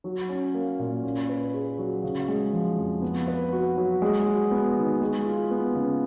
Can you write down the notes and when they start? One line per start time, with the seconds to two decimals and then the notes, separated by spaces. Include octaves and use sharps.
0.04 F#3
0.29 C#4
0.54 A#3
0.79 A#2
1.04 C#4
1.29 B4
1.54 G#4
1.78 F#3
2.03 C#3
2.28 G#3
2.53 F3
2.77 F2
3.02 B3
3.28 B4
3.53 F#4
3.77 F#3
4.02 G#3
4.26 F#4
4.51 B3
4.76 D#3
5.01 G#3
5.26 F4
5.51 B3
5.75 C#3